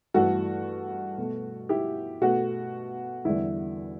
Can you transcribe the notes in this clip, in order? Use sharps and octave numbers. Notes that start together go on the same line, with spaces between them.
G2 E3 A3 F#4 A4
B2 A3
E4 G4
B2 A3 F#4
E2 D3 G3 E4